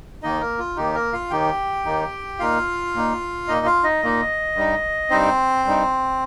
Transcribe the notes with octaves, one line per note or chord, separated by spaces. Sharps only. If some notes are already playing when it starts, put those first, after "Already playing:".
D#2 D#3 A#3 D#4 D#5
A#3 A#4
F4
D#2 D#3 A#3 D#4 G4
A#3 A#4
F4 F5
D#2 D#3 A#3 D#4 G4 G5
D#2 D#3 A#3 D#4
A#2 A#3 D#4 F4 F5
A#2 A#3 D#4
A#2 A#3 D#4 D#5
F4 F5
D#4 D#5
A#2 A#3 D#4
G2 G3 D#4
G2 G3 C4 D#4 C5
G2 G3 D#4